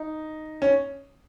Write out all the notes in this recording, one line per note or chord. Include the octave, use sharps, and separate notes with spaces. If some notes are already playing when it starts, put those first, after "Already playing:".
Already playing: D#4
C#4